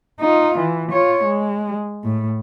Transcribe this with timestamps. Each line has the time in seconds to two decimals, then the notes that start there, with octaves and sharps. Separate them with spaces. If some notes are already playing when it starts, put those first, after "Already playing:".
0.20 D#4 F4
0.59 E3
0.92 F4 C#5
1.25 G#3
2.04 A2